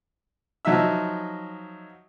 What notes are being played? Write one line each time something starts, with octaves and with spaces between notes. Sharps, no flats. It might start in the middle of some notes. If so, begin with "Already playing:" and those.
F3 F#3 D#4 D#5 E5 E6